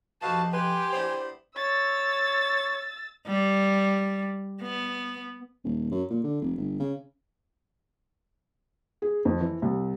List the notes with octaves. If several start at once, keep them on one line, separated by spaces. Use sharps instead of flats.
F2 C3 D#4 F#4 B4 F5 A5
G4 B4 G#5 C6
B3 D4 E4 C5
C#5 E6 A6
G3
B3
D#1
F#2
A#2
D3
F1
G1
C#3
G#4
F2
E3
C2